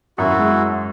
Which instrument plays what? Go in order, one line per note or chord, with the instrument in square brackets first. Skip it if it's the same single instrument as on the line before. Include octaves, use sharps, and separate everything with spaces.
[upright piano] F#2 [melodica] E4 F#4
[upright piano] G#3